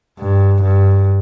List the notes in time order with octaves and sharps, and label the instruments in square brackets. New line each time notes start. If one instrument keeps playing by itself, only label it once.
[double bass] G2
G2